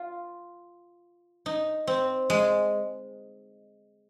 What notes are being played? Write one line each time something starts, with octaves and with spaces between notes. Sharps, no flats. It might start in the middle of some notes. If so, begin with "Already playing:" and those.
Already playing: F4
D#4
C4
G#3